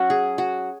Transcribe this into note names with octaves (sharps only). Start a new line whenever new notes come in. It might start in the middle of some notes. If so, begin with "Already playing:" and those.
Already playing: F#3 C#4 F#4
G#4
F#4